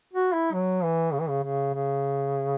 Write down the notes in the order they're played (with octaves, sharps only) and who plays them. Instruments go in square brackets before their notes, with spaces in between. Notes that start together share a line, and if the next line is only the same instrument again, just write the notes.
[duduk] F#4
E4
F#3
E3
C#3
E3
C#3
C#3
C#3